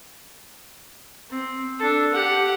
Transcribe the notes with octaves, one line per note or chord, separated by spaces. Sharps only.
C4
D4 A4
G4 F#5